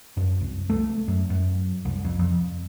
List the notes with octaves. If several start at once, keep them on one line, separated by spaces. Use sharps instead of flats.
F#2
C2
A3
F#2
F#2
C2
F2
F2